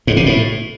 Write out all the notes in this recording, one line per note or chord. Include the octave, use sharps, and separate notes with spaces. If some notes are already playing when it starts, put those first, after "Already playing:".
G#2
C3
A2